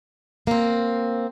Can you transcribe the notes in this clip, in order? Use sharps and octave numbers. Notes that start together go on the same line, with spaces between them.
A#3 C4